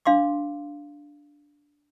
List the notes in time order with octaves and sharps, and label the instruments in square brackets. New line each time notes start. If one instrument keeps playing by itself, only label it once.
[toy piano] D4 F5 C6 D6